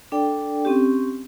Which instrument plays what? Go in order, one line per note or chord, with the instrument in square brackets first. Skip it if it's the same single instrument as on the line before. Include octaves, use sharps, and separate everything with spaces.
[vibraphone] D4 A4 D5 G5
C4 C#4 G4